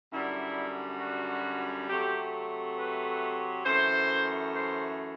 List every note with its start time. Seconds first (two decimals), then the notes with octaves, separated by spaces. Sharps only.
0.12 F#2 D3 G3 E4
1.00 F#4
1.89 C3 F#3 A3 G4
2.77 B4
3.65 F#2 E3 A3 C5
4.54 C5